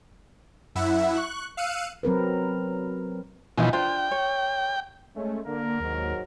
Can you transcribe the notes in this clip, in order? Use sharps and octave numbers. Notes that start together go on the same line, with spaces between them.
F#2 E4 E5 F#5
C#6 F#6
F5 E6 F#6 C#7 D#7
F#3 C4 A#4 B4
B2 E3 F3 D#4 G#5
D4 F4 C5 G5
C#5
G#3 A3 C#4
D3 A#3 A#4
D#2 G#2 F#3